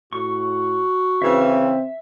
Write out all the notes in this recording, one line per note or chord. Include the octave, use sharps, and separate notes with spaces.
A2 F#4 C#6
C#3 E3 C4 E5